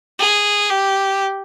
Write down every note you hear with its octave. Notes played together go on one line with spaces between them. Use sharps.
G#4
G4